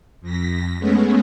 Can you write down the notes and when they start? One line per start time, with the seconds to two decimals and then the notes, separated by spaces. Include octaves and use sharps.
0.21 F2 A#6 B6
0.78 G#3 A3 B3 C#4